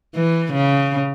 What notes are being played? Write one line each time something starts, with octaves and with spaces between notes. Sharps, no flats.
E3
C#3